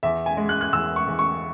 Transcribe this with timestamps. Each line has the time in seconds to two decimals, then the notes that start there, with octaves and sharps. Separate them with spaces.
0.03 E2 E5
0.26 G#5
0.37 G#3
0.49 F#6
0.61 F#6
0.73 E2 E6
0.96 C#6
1.07 E2
1.19 C#6